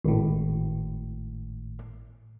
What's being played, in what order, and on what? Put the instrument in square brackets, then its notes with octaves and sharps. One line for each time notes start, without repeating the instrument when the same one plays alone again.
[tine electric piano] G#1 A2